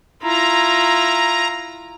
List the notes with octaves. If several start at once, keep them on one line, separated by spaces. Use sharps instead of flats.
E4 F4 A#5